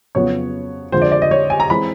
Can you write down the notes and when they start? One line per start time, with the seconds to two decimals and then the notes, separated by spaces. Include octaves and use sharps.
0.15 F2 C#3 F#3 B3 C#5
0.92 F2 D3 F3 G#3 C5
1.02 D5
1.12 D5
1.22 D#5
1.31 C#5
1.50 G#5
1.60 A#5
1.70 E3 G#3 C4 B5